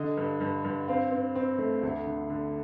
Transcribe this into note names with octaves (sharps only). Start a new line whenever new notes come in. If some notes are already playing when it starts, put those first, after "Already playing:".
Already playing: D3 D#5
G2
G2
G2
C4 F5
C4
C4
A3
D2
D3
D3